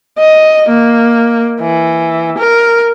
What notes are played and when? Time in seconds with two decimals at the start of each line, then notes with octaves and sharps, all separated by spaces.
0.18 D#5
0.69 A#3
1.61 E3
2.38 A#4